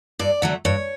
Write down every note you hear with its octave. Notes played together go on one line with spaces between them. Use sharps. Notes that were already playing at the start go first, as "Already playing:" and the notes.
G2 D5
D3 F#3 A3
G2 C#5